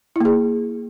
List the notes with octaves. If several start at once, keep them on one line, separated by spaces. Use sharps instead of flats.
A#3 E4 G#4